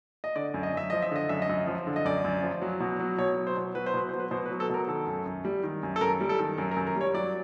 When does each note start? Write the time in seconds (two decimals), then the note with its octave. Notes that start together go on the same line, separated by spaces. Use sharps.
0.24 D#5
0.36 D3 D5
0.54 F#2
0.63 D#5
0.74 F#2 E5
0.90 F3 D#5
1.02 E5
1.11 D3 D#5
1.29 F#2 E5
1.42 D#5
1.49 F#2
1.67 F3
1.87 D3
1.96 D#5
2.05 F#2 D5
2.25 F#2
2.43 F3
2.62 F#3
2.80 B2
3.00 F#3
3.18 B2 C#5
3.37 F#3
3.47 C5
3.57 B2
3.75 F#3 B4
3.86 C5
3.94 B2 B4
4.09 F#3 C5
4.20 B4
4.31 B2 C5
4.45 B4
4.51 F#3
4.60 A4
4.69 B2 A#4
4.88 D#3 A4
5.07 F#2
5.26 F#2
5.45 G3
5.63 D#3
5.83 F#2
5.96 A4
6.01 F#2 A#4
6.21 G3
6.29 A4
6.39 D#3
6.58 F#2 A#4
6.71 A#4
6.76 F#2
6.87 A#4
6.96 G3
7.01 C#5
7.14 F#3 D5